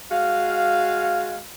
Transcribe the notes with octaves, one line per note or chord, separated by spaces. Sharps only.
G#3 F#4 F5